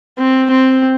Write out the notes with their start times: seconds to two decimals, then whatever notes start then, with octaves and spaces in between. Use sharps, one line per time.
0.18 C4
0.50 C4